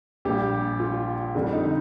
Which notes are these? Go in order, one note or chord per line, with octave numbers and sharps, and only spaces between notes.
A#1 A#2 G3 G4
F4
F2 D3 G3 G4
D#4